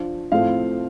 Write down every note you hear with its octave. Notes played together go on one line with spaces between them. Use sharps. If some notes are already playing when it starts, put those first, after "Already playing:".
Already playing: F3 D4
A2 F3 A3 C4 F5